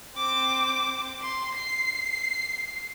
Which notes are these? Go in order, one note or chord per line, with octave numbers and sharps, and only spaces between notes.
C4 D6
C6
C7